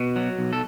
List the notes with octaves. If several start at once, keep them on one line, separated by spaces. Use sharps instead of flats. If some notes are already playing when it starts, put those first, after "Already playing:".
Already playing: B2
F#3
B1
A4